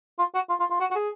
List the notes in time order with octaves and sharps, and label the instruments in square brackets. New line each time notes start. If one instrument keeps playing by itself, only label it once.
[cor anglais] F4
F#4
F4
F4
F4
F#4
F#4
G#4